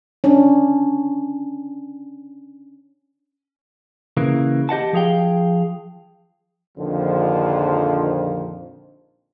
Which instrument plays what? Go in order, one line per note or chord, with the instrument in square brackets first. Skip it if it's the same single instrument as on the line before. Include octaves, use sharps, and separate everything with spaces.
[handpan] C#4 D4
[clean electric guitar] C#3 E3 A#3
G4 D#5 F#5 A5
F3 G#4 F5 G5
[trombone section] A#1 F2 D3 D#3 F3 C5